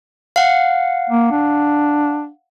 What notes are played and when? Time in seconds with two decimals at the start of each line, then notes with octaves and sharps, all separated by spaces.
0.36 F5 F#5
1.10 A#3
1.31 D4